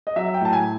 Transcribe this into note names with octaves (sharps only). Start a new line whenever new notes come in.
D#5
F#3 E5
G5
A2 A5
G#5